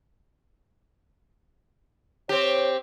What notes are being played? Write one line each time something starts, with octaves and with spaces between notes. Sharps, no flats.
C4 G4 C#5